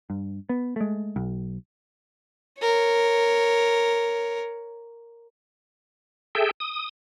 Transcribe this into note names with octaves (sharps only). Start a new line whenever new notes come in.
G2
B3
G#3 A3
B1
A#4 C#5
G#4 A4 E5 G5
D#6